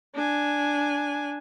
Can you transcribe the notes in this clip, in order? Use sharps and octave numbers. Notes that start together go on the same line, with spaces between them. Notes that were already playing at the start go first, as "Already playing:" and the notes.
D4 G#5